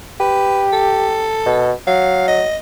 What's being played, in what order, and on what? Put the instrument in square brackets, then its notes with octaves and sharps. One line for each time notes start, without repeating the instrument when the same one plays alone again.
[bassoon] G4 [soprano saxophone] B4
[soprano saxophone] A4
[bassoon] B2
[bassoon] F#3 [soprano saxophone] F5
[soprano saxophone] D#5